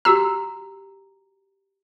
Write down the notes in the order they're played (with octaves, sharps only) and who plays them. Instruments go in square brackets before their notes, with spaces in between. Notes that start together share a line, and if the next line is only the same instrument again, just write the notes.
[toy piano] F#4 G4 A#5 [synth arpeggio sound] E6